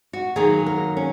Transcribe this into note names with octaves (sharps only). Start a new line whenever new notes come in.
F#4
D#3 F#3 A#3 G#4
A#4
C#4